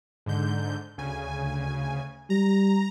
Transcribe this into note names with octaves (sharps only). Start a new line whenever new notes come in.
G#2 D3 G6
D2 C#3 G#5
G3 A#5